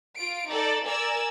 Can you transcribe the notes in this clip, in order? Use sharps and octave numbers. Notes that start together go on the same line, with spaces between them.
F4 D7
D#4 A4 D5
A#4 D5 G#5 E6